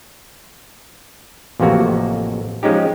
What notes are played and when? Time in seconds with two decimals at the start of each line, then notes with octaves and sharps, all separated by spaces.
1.60 A1 F2 C3 A#3 F#4
2.63 F3 G#3 C#4 D#4 G4